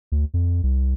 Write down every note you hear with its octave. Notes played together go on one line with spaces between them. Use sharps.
D2
F2
C2